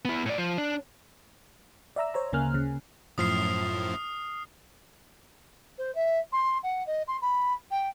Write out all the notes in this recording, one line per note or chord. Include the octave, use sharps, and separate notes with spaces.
B3 E4
A2 D5
F3
D4
D5 E5 A#5 E6
C5 C#5 A#5
D2 C#3 A#3 G#5 F6 F#6
C#3
F#2 A2 F3 D#6 F6 C7
C5
E5
C6
F#5
D#5
C6
B5
G5